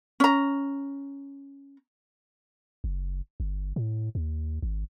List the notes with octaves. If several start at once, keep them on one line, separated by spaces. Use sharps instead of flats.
C#4 A#5
F#1
G1
A2
D#2
G#1